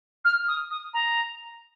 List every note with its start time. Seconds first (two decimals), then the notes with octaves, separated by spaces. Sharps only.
0.24 F6
0.47 D#6
0.70 D#6
0.93 A#5